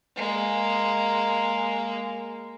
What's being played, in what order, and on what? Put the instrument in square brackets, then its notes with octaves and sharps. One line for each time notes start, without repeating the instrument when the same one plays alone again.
[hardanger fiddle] G#3 A#3